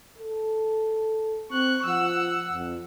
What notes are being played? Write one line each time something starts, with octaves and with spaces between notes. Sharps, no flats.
A4
C4 C#6 F#6
F3 F#5 E6
F2